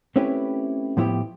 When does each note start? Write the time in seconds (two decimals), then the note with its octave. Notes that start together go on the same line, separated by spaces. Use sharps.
0.16 A3 C4 C#4 E4 G4 B4
0.97 A2 F3 B3 E4 G4